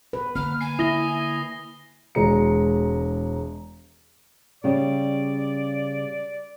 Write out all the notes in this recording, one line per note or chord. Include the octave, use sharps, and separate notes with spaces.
B4
D3 A#3 F6
G#5 C7
E4 D#6 A#6 G7
E1 G#3 A#5 C#7
C#3 G3 G4 D5